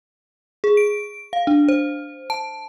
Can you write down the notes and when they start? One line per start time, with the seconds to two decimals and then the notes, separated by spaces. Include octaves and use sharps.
0.64 G#4
0.77 D7
1.33 F5
1.47 D4
1.68 C5
2.30 A5